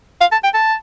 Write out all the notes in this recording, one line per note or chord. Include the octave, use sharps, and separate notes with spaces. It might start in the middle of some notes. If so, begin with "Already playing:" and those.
F5
A5
G5
A5